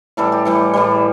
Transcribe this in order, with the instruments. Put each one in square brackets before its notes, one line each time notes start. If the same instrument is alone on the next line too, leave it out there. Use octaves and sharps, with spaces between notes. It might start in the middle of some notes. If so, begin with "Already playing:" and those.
[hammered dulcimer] A2 E3 G3 A4
G4
A2 E3 G3 A4
A2 E3 G3